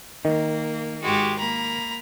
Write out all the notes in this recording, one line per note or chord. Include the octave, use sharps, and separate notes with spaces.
D#3 A#3
G#2 G#3 F#4 G4
A#3 A#5 B5